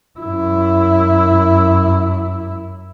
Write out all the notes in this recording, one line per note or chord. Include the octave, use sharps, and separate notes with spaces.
F#2 E4